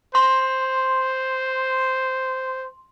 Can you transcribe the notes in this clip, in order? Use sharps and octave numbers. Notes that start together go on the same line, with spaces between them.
C5 C6